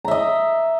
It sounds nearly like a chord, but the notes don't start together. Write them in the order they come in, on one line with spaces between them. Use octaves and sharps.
A#5 E5 D#5